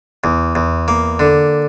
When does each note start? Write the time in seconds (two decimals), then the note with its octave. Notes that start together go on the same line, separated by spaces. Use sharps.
0.24 E2
0.55 E2
0.88 A#3
1.19 D3